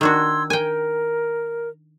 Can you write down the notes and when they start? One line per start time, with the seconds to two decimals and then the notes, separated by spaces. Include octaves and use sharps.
0.01 D#3 D4 F#4 C6 E6 G#6
0.50 A#4 G5 G#5